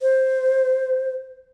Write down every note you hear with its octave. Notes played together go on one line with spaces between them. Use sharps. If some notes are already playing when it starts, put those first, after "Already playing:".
C5